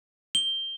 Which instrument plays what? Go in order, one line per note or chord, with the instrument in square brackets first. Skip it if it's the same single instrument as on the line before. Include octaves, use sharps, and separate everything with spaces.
[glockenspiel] G7